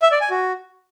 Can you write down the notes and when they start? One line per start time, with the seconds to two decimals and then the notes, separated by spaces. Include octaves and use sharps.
0.02 E5
0.12 D5
0.21 G#5
0.30 F#4